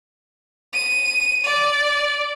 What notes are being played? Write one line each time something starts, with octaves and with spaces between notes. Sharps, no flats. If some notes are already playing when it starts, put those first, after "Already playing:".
D#7
D5